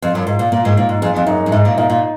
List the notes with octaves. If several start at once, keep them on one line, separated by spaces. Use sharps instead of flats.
F2 F4
F#2
G#2 F4
A#2
A#2 A#3
G#2
A#2 D#3
G#2
F2 G#3
F2
F#2 D#4
F#2
G#2 D#4
A#2
A#2 D#4
A#2